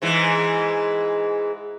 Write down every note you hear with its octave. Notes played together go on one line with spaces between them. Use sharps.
G#2 E3 G#3